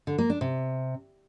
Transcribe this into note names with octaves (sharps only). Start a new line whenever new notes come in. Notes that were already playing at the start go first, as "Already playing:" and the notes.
D3
A#3
D4
C3